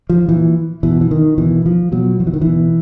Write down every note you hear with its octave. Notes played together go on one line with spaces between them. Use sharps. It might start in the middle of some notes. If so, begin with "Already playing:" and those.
F3
A#2 E3
B2 E3
E3
D#3
B2 E3
F3
B2 F#3
F3
E3
D#3
E3
B2